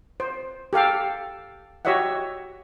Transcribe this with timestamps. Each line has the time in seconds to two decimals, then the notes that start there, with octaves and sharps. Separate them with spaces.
0.20 C5
0.73 G4 A4 F5 G5
1.85 F#4 G4 C#5 D#5 E5 F#5